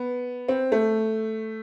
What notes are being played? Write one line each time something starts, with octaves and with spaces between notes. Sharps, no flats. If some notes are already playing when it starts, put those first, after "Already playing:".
Already playing: B3
C4
A3